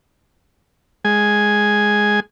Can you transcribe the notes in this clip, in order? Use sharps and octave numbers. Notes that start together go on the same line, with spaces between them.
G#3 G#5